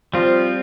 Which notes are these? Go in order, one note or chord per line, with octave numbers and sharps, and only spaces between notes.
F3 G3 C4 F4